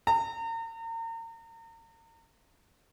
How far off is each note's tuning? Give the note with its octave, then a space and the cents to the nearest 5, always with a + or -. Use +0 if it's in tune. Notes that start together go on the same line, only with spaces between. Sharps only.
A#5 -40